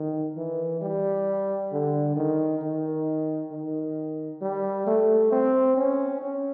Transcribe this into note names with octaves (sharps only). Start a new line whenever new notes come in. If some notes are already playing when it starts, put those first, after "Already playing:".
Already playing: D#3
E3
G3
D3
D#3
D#3
D#3
G3
A3
C4
C#4
C#4